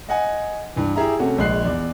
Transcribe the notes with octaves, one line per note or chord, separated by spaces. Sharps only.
D#5 F#5 G#5
G2 E3
E4 G4 G#4 E5 A#5
C3 A3 C#4 F#4
A#1 G#3 F#6 C7
E2 D5